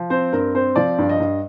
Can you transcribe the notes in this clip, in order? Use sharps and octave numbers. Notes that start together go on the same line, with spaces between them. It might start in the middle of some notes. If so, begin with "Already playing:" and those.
Already playing: F3
C4 C5
G2 A#4
C4 C5
F3 D5
G2
D#5
G2